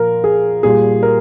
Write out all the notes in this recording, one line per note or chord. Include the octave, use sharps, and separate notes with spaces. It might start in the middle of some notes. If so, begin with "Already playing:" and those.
Already playing: A#2 F3 A#4
G#4
A#2 G3 G#4
A#4